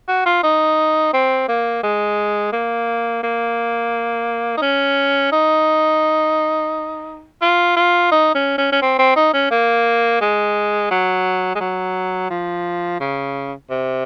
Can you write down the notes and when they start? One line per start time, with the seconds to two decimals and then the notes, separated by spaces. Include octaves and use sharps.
0.08 F#4
0.26 F4
0.43 D#4
1.13 C4
1.48 A#3
1.83 G#3
2.53 A#3
3.23 A#3
4.57 D#4
4.62 C#4
5.32 D#4
7.42 F4
7.76 F4
8.12 D#4
8.35 C#4
8.58 C#4
8.72 C#4
8.82 C4
8.99 C4
9.16 D#4
9.33 C#4
9.51 A#3
10.21 G#3
10.90 F#3
11.55 G#3
11.60 F#3
12.30 F3
13.00 C#3
13.70 C3